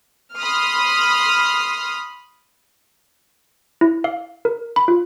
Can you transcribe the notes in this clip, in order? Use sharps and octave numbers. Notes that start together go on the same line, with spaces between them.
B5 C6 D#6 F6
E4
F5
A#4
B5
F4